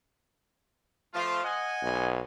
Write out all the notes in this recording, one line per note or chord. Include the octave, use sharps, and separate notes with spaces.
F3 A3 F4
D#5 F#5 G#5
B1